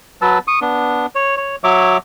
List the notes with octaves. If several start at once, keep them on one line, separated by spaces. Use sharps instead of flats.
F#3 B4 A5 E6
C#6 D#6
B3 D4
C#5
C#5
F#3 C#5 E5 D6